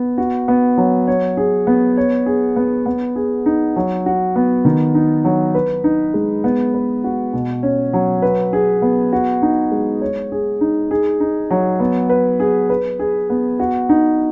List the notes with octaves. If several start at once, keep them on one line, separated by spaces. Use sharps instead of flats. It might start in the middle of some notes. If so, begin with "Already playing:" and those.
Already playing: B3
F#4
B3
F#3
C#5
G#4
B3
C#5
G#4
B3
B3
G#4
D#4
F#3
F#4
B3
D#3
D#4
F#3
B4
D#4
G#3
B3
B4
F#4
B2
C#4
F#3
B4
G#4
B3
F#4
D#4
G#3
C#5
G#4
D#4
G#4
D#4
F#3
B3
B4
G#4
B4
G#4
B3
F#4
D#4